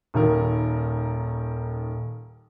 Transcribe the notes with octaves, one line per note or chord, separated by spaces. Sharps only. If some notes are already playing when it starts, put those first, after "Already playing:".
D#1 D#3 A#4